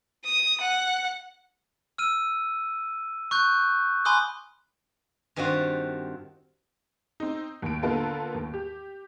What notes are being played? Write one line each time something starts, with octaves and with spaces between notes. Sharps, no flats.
D#6
F#5
E6 F6 D#7
C#6 F#6 G6
G#5 B5 C6 D6 D#6 F#6
G2 D#3 G3 C4 F4 F#4
C4 D#4
D#2 D7
D3 A#3 B3 F4 A4 B4
D#2
G4